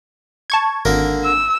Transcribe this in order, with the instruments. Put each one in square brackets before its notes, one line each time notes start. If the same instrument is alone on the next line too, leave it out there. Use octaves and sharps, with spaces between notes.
[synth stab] A5 C#6 G#6
[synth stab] G#1 [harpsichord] D3 A#3 A#4
[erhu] E6